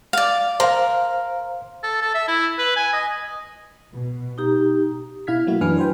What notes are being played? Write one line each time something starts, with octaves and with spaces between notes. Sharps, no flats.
D5 F5
A#4 C5 F5
A4
A4
E5
E4
B4
G#5
D#5
B2
D#4 G4 A#5
B2 E4 F5 F6 G#6 B6
F#3 A3 A#3 E4 F#4
F#2 E3 D4 B4 G#5 F6
B4 C5 G5